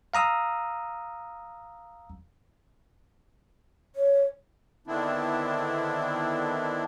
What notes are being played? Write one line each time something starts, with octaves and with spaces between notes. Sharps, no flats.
F5 A#5 D#6 E6
C#5
D3 D#3 B3 C4 D4 E4